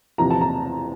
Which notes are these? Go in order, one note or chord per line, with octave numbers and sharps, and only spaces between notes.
E2 C3 F3 A#5
A5
A#5